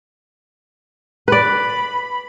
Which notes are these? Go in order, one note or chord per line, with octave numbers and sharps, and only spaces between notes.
B4 D5 B5